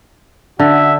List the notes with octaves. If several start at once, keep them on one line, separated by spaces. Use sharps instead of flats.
D3 F#4 E5